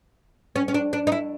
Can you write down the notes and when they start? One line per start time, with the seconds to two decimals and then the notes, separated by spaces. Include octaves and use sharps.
0.56 C#4
0.68 C#4
0.74 D4
0.93 D4
1.07 D#4
1.12 E4